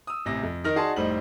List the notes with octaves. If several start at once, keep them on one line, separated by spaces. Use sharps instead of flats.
D#6 E6
A1 C3 A#6
F2
D#3 D#4 A#4 F6 A#6
D#4 F#4 G#4 D5 A5 C6
F1 A2 G3 D#4 C5 F#7